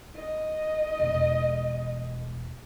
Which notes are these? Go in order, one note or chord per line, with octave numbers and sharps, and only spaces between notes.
D#5
E1